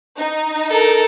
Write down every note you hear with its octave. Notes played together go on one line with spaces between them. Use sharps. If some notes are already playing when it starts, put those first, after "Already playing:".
D#4
A4 A#4